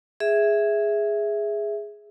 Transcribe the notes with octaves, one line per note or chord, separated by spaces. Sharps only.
G#4 E5